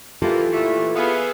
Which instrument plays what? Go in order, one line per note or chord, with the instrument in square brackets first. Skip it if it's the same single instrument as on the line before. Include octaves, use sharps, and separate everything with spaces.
[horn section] D#3 A#3 [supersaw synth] E3 [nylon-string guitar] F4 G4 A4
[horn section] A#2 A3
[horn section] B3 [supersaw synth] G#4 E5 F5